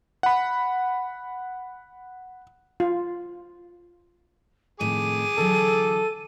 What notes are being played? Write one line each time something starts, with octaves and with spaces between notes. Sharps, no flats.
F#5 B5
F4
F2 A2 D#3 G#4 D6 D#7
D3 E3 F#3 A4